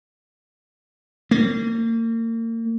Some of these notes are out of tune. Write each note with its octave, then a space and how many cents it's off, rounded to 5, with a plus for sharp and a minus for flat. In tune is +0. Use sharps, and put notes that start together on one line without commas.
A#3 -35